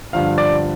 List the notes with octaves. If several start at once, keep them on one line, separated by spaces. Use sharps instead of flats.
G2 D3 F3 F5
D5